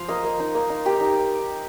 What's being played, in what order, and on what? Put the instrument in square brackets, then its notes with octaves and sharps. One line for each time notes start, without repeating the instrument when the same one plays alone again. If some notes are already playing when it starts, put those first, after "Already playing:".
Already playing: [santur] F3 C5 F5
A#3 F4 D#5
A#3
D#4
A#3
D#4
A#3 G4
D#4